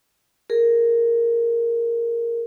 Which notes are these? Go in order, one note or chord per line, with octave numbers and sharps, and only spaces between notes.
G#4 A#4